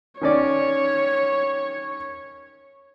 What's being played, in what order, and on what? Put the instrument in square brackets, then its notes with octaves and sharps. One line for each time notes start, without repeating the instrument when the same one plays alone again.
[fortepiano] D#3 C#4 D5 [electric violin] C#5